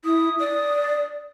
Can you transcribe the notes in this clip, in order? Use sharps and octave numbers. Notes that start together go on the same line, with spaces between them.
E4 D#6
D5